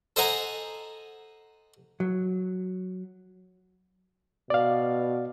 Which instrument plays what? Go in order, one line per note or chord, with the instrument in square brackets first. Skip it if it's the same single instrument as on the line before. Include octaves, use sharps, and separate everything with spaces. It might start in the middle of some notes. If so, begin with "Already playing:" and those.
[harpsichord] A4 C5 D#5 F#5 G#5 A#5
[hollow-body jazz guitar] F#3
[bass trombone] B2 [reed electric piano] D5 F5